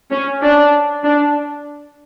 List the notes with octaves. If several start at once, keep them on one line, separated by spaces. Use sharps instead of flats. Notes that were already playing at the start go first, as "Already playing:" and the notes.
C#4
D4
D4